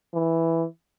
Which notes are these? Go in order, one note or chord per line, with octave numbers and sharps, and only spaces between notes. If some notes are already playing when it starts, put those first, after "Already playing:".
E3